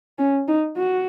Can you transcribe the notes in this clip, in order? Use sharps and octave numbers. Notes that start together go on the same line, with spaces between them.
C#4
D#4
F#4